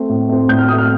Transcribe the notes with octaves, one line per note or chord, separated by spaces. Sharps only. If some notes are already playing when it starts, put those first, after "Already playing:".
Already playing: A3 C4
A2
A3 C4
A2 G6
F6
A3 C4 D#6
F6